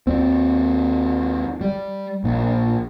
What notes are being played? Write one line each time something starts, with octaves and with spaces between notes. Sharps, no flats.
D#2 C4
G3
A#1